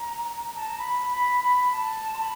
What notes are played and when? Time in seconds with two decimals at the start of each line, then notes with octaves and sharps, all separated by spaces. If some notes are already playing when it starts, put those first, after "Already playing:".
Already playing: A#5
0.55 A5
0.67 A#5
0.78 B5
1.09 B5
1.41 B5
1.72 A5
2.14 C6
2.19 B5